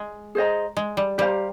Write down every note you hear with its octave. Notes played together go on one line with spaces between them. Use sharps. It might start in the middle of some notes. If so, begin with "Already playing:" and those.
Already playing: G#3
G#4 C5 D#5 A#5
G#3
G3
G3 G4 C5 F5 A#5